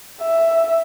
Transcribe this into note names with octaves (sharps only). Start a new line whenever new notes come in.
E5